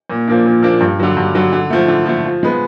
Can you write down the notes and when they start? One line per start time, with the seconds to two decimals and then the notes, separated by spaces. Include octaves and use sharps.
0.10 A#2
0.28 F3 A#3 D4
0.46 A#2
0.62 F3 A#3 D4
0.81 G2
1.00 D3 F#3
1.17 G2
1.35 D3 F#3
1.53 D3
1.70 F3 A3
1.88 D3
2.06 F3 A3
2.24 F3
2.43 G#3 B3